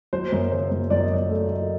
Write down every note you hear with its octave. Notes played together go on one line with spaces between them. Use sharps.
F#3 C5
F#2
C#3 C5
F#2
F#2 D5
D#5
F#3 D5
A3
A3